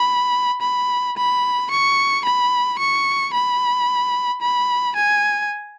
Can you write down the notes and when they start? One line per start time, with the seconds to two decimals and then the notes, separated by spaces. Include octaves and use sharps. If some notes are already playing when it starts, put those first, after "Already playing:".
Already playing: B5
0.62 B5
1.17 B5
1.71 C#6
2.25 B5
2.79 C#6
3.34 B5
4.42 B5
4.96 G#5